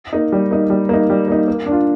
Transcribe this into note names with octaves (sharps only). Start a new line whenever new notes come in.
A#3 D#4
G3
A#3 D#4
G3
A#3 D#4
G3
A#3 D#4
A#3
D4
F4